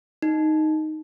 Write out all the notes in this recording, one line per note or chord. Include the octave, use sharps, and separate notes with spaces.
D#4